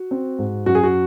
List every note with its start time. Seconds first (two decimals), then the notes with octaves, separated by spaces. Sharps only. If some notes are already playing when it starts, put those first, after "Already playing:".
Already playing: F#4
0.11 C4
0.39 G#2
0.66 F#2 F#4
0.75 G#4
0.83 F#4